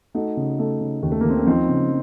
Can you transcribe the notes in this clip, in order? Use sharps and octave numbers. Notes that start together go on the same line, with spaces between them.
A3 D#4 F#4
C#3
A3
C#3
D#2
A3
D#2 A#3
C4
C#4
F3 C4 D#4
C#3